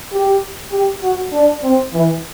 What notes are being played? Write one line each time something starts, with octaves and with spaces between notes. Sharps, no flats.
G4
G4
F#4
D4
C4
E3